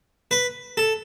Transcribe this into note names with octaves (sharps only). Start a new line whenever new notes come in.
B4
A4